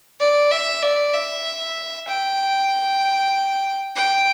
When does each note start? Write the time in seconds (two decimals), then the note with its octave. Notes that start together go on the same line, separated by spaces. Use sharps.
0.20 D5
0.51 E5
0.82 D5
1.14 E5
2.08 G5
3.96 G5